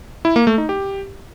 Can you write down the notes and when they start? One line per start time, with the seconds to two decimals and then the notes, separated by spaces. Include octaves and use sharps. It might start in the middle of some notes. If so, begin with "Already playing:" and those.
0.25 E4
0.36 A#3
0.47 A3
0.58 D#4
0.69 G4